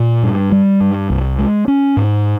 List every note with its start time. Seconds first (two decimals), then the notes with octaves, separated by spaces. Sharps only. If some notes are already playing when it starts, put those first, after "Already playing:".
Already playing: A#2
0.23 G2
0.52 G3
0.80 G2
1.10 C2
1.39 G#3
1.68 C#4
1.97 G#2